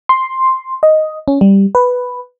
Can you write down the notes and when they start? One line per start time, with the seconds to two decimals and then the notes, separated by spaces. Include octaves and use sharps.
0.09 C6
0.83 D#5
1.28 C#4
1.41 G3
1.75 B4